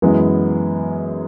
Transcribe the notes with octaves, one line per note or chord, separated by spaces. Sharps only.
F#2 E3 G#3 B3